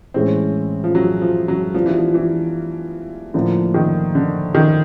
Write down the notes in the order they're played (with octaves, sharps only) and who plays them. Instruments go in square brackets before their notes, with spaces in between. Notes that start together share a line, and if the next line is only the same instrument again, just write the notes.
[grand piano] A2 E3 G#3 C#4 [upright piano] C4
[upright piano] F3
F#3
F3
F#3
[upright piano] F3 [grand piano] G3 B3 D4 F4
[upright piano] E3
F3
E3
[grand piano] A2 F3 A#3 [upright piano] D3
[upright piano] D#3
D3
D#3